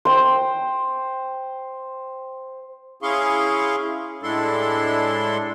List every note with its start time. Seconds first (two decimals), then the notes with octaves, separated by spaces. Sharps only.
0.05 C5 G5
3.03 C#4 E4 G#4 F5 C6 C#6
4.23 A2 G#3 D4 E4 A4 C6